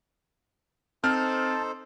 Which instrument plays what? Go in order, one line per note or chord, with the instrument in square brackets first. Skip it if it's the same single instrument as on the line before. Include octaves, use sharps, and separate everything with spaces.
[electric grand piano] C4 [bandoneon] D#4 A4 C5 [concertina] A5 [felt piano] F6